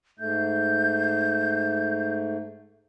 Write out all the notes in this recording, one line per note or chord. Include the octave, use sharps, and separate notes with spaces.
G#2 A3 G6